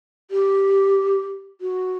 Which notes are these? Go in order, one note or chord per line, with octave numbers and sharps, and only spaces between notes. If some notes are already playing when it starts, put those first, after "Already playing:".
G4
F#4